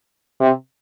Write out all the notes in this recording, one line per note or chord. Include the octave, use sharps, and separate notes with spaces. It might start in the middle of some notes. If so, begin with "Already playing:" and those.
C3